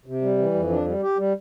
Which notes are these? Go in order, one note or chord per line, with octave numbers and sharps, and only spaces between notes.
C3
G3
E3
F2
D4
G3
G4
G3